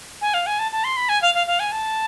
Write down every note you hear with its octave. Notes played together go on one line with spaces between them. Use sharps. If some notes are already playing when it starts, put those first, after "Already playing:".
G#5
F5
G#5
A5
A5
C6
B5
G#5
F5
F5
F5
G#5
A5